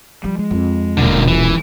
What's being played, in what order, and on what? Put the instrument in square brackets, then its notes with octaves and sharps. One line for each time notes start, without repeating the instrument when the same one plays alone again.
[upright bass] F3 [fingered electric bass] G3
[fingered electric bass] G#3
[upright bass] F2
[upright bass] D#1 B2 [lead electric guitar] D3 A#3
[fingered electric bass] B1 E2 G#2 [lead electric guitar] E3